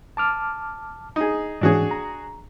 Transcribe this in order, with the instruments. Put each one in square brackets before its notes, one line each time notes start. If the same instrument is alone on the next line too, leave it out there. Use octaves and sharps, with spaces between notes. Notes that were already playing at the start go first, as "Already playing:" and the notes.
[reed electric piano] A5 D6 F6
[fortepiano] D#4 G#4
[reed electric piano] G#2 E3 C#4 [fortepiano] D4 F#4 G#4
[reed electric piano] A#5